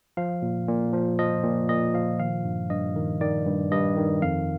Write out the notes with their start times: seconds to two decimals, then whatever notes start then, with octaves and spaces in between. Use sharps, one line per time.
0.17 F3 F5
0.42 A#2
0.68 A#2
0.93 F3
1.19 F3 D#5
1.44 A#2
1.69 A#2 D#5
1.94 F3 F5
2.19 D#3 F5
2.45 G2
2.70 G2 D#5
2.96 D#3
3.21 D#3 D5
3.46 G2
3.71 G2 D#5
3.97 D#3
4.22 F2 F5